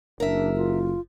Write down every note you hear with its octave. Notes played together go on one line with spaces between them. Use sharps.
F#1 D4 A#4 E5
F4